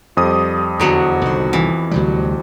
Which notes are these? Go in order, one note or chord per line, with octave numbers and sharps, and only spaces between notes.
F2 F3 G3 D#6
E2 D3 F#3 B3 F#4
C2 D#3
E3
D2 C3 F#3 G3